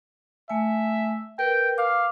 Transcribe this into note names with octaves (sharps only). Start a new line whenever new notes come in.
A3 E5 G#5
A#4 B4 G5
F5 D6